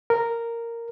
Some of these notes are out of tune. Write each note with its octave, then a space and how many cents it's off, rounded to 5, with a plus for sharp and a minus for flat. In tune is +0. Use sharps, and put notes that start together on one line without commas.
A#4 -5